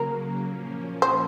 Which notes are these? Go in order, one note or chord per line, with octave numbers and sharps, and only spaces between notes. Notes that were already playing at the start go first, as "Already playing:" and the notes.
Already playing: C#3 F#3 A#3 A#4
A#2 F3 A#3 C#4
C5